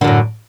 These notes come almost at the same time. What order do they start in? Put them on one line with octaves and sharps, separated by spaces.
D3 F#2 A2